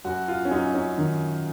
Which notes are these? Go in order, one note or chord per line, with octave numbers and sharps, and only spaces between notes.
F#2 F#4
F4
C#4
F#2 D#4
C#4
D#3